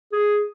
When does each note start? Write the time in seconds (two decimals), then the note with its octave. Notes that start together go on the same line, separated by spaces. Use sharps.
0.12 G#4